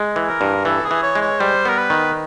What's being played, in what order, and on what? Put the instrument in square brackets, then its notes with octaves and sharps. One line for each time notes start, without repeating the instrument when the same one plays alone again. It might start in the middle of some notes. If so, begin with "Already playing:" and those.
Already playing: [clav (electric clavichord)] G#3
E3
[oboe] A#4
[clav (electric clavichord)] G2
[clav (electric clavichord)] E3 [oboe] A4
[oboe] G#4
[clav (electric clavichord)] E3
[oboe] C#5
[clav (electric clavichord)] G#3
[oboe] C#5
[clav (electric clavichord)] G3 [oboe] C5
[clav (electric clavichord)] B3 [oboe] A#4
[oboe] B4
[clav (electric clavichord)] D#3